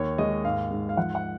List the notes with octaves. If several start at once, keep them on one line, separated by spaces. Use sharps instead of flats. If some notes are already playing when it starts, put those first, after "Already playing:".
Already playing: D#2 C#5
G#3 D#5
G#2 F5
G#2
F5
F3 F#5
F#5